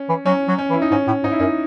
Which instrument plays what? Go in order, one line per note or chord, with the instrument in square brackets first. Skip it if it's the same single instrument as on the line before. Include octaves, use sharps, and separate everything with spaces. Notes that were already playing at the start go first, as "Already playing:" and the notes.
Already playing: [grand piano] C#4
[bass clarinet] E3
[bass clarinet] F#3 [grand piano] C#4
[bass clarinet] F#3
[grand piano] C#4
[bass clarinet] E3
[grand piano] E4
D#4
[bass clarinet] G#2 [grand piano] C#4
[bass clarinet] A2
[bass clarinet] G#2 [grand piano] D#4
[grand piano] E4
[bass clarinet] F#2 [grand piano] D#4